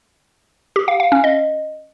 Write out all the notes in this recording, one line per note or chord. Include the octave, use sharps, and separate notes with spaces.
G4
F5
F5
C#4
D#5